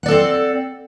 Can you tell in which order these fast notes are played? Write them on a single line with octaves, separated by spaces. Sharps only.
F#5 D5 A4 C4